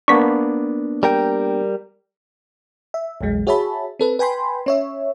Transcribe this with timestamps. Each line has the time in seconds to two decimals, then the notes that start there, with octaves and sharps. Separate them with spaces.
0.08 A#3 B3 D4 C#6 B6
1.03 G3 A#4 G5
2.94 E5
3.21 A#1 E2 F#3 G#3
3.47 F#4 G#4 C#5 E5 A5 B5
3.99 C4 A4 B4
4.19 B4 G5 G#5 B5 C6
4.66 C#4 C#5 E5